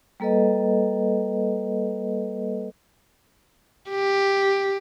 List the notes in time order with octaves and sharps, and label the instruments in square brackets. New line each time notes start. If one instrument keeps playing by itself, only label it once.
[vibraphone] G3 A#3 A4 B4 D#5
[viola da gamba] G4